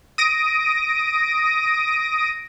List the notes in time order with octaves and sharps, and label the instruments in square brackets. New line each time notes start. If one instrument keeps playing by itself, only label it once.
[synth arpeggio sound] D#6 A#6 D7 D#7